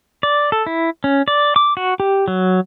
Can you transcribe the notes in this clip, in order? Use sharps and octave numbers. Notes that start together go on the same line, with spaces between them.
D5
A4
E4
C#4
D5
D6
F#4
G4
F#3